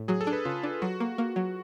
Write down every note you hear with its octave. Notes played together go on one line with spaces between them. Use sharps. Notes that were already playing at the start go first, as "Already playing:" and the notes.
Already playing: A2
F#3 G#4
A4
D4
B4
C#3 F4
D4
F#3 F#4
A#3
A#3
F#3